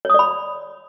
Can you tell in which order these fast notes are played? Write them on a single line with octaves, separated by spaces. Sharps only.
C#5 D#6 D5 B5